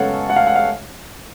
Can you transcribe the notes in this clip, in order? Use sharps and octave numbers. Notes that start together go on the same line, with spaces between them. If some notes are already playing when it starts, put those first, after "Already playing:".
Already playing: F#2 C#3 G#3 B3 A4 C#5 F5 F#5
F#5
F5
F#5
F5